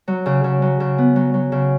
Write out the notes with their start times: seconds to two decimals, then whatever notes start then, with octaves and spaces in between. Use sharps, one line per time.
0.08 F#3
0.26 C#3
0.44 C#3
0.62 F#3
0.80 C#3
0.98 B3
1.16 F#3
1.34 F#3
1.52 C#3